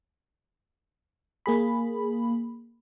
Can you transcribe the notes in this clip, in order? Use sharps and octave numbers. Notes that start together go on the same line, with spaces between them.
A#3 G#4 B5